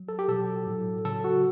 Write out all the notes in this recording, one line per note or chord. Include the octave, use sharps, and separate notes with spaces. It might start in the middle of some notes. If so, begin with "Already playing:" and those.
Already playing: F#3
A4
G4
B2 F#3 A4
A2 F#3
C#3 F#3 A4
F#4